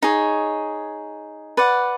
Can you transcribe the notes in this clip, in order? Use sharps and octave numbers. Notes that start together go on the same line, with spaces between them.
D#4 G#4 C#5
B4 D5 F#5